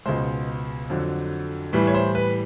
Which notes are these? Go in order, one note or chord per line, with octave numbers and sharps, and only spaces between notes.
C#2 B2 G#3 C5
F2 D3 F#3
A2 E3 G3 B4
C#5
C5
B4